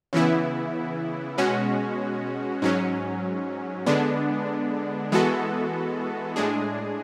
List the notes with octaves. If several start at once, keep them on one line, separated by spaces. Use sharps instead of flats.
C#3 E3 B3 E4
B2 G#3 C#4 F#4
G#2 F#3 C#4
D3 G#3 B3 D4
E3 G#3 B3 F#4 A4
A2 G#3 D4 G#4